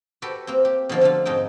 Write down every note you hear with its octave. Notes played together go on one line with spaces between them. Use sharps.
F#4 G4 A4 B4 G5
A#3 C4
G4
B2 D3 F3 A#3
D3 F3 A3 F4
F2 G#2 D#4 G5